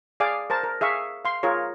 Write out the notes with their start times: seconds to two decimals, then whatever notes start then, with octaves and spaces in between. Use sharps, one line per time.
0.20 G#4 D5 F5 G#5 D6
0.50 A#4 C5 A5
0.64 A#4
0.81 G#4 E5 F5 C#6
1.25 F5 C6
1.43 F4 G#4 A#4 C#5